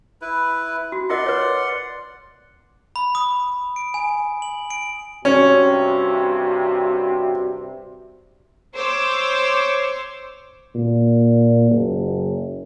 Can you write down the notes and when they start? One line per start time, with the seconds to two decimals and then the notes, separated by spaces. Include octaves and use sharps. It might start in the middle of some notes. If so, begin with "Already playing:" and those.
0.22 E4 B4
0.92 F#4
1.10 F4 A#4 D5 D#5 F#5 C6
1.26 B4 C#5
2.96 B5
3.15 D#6
3.76 D7
3.94 G#5
4.42 F#7
4.70 D7
5.25 G2 C3 C#4 F#4
8.75 C5 C#5 C6 D6 E6
10.75 A#2
11.71 F#1